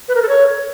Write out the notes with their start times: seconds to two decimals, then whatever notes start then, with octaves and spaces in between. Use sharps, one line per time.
0.08 B4
0.15 A#4
0.22 A4
0.29 C#5